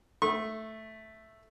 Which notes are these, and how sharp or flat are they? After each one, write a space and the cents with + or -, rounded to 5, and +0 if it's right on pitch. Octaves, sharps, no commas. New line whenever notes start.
A3 +0 C#6 -30